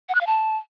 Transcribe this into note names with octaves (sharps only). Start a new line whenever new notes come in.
F#5
F#6
F5
A5